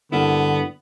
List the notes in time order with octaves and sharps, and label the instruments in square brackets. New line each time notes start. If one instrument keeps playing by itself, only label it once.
[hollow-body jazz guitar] G2 A#3 E4 [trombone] D3 [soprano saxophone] B3